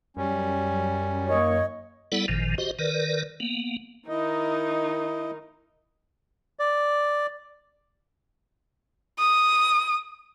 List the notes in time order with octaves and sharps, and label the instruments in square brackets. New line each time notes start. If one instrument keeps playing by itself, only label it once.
[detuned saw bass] F#2 [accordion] G3 C#4
[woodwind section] D#3 A#3 C#5 [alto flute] D#5
[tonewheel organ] G3 B3 E4 A4 D5 F#5
G#1 A#2 D#3 F3
F#4 G4 C5 D#5
D#3 A#4 B4 D5
A#3 B3
[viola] D#3 D#4 [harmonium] E4 D#5
[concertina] D5
[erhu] D#6